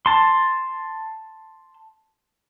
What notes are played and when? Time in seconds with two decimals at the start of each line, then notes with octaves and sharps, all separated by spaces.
0.06 A5 C6